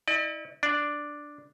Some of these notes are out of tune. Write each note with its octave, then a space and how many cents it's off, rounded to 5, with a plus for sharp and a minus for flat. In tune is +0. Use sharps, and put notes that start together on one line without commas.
E4 -35 D5 +40
D4 +0 D5 +0